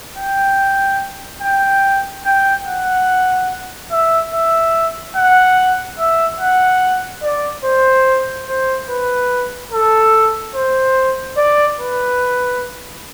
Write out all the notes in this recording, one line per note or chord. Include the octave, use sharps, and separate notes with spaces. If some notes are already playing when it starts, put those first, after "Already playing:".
G5
G5
G5
F#5
E5
E5
F#5
E5
F#5
D5
C5
C5
B4
A4
C5
D5
B4